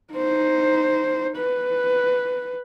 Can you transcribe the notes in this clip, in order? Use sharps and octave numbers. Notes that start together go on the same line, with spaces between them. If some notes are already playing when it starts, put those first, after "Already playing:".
D#4 C5
B4